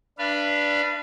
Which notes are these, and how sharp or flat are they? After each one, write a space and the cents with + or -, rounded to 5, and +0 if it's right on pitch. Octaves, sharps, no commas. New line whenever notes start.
D4 +0 B4 +0 F5 -35